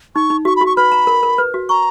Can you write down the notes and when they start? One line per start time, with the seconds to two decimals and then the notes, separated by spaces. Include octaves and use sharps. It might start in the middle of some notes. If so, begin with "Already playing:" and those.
0.15 D#4 C#6
0.30 D#4
0.45 F#4 C#6
0.56 B5
0.61 F#4
0.66 C#6
0.76 B4 B5
0.92 A#5
1.07 A#4
1.23 A#4
1.38 B4
1.54 F#4
1.69 A#5 C#6